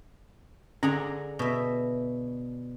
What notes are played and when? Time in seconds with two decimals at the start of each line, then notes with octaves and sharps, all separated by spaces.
0.83 D3 C#4 G#4 A#5
1.39 B2 E5